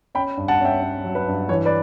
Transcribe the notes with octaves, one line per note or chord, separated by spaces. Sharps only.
C#4 G5 B5
G2
F#5 A5
C#4 E5 G5
C#4
F#3
B4
G2
E3 C#5
B4 D5